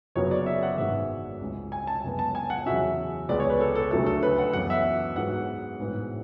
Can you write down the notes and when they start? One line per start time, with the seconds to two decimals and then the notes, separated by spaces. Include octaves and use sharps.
0.16 F#1 F#2 C#3 F#3 B3 C#5
0.31 D5
0.46 E5
0.63 F#5
0.78 G#1 G#2 G#3 B3 E5
1.41 C#2 C#3 G#3
1.72 G#5
1.87 A5
2.03 F#2 C#3 G#3 B3
2.19 A5
2.35 G#5
2.50 F#5
2.65 E2 C#3 F#3 C#4 E5
3.29 C#2 C#3 G#3 B3 D5
3.40 C#5
3.50 B4
3.61 A4
3.75 A4
3.91 D2 C#3 F#3 A3 A4
4.06 A4
4.23 B4
4.38 F#5
4.53 F#2 E3 B3 F#5
4.70 E5
5.16 G#2 F#3 B3 F#5
5.80 A1 G#2 E3 B3